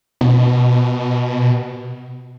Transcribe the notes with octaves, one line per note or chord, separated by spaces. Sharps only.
B2